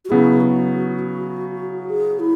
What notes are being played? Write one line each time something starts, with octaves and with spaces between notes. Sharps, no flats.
F#4
C#3 F#3 B3 E4 G#4
F#4
G#4
E4